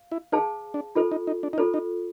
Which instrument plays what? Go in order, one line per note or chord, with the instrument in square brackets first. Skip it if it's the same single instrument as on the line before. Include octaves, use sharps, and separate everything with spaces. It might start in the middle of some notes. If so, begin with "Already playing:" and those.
Already playing: [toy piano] F5
[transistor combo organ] E4
[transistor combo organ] D#4 [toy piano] G#4 C5 F5 A5
[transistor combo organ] D4
[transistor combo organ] D#4 [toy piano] F4 A4 C5
[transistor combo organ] D#4
D#4
D4
D#4
[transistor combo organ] D4 [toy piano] F4 A4 C5
[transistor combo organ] D#4